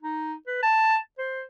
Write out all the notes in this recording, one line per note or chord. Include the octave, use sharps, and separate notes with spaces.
D#4
B4
A5
C5